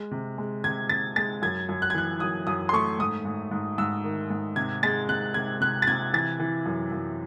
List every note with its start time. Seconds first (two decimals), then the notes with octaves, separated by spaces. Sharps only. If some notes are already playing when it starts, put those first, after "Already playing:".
Already playing: G#3
0.11 C3
0.38 G#3
0.64 C3 G#6
0.89 C3 A6
1.16 G#3 A6
1.42 F#2 G#6
1.69 F#2
1.82 F#6
1.90 G#6
1.94 E3 F#6
2.20 F#2 D#6
2.47 F#2 D#6
2.69 C6
2.73 A3 C#6
2.99 G#2 D#6
3.25 G#2
3.51 G#2
3.78 G#2 E6
4.04 D#3
4.30 G#2
4.56 C3 G#6
4.83 G#3 A6
5.09 C3 F#6
5.34 C3 G#6
5.60 C3 F#6
5.82 A6
5.87 C3 G#6
6.13 E3 A6
6.40 E3
6.66 F#2
6.92 F#2